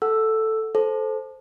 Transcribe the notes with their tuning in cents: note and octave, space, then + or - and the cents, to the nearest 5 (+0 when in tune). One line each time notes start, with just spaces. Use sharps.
A4 +0 F#5 +0 E6 +5
A4 -15 C5 +0